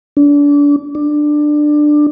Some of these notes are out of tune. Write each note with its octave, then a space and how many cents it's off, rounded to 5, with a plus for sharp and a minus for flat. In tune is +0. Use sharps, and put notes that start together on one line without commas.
D4 -30
D4 +15